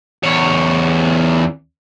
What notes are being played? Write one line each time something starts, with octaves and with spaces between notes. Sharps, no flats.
E2 C#5